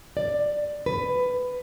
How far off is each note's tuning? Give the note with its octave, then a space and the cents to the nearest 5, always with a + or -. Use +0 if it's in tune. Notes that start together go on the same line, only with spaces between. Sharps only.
D5 +10
B4 +15